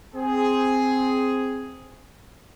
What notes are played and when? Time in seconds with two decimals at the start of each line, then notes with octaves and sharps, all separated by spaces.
0.15 C4 G#4